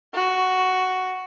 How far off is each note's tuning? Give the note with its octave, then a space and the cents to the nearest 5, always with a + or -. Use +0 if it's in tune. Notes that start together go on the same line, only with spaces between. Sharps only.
F#4 +5